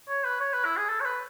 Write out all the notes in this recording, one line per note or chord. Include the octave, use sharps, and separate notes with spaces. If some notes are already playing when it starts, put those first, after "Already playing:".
C#5
B4
C#5
B4
E4
G#4
A4
C#5
B4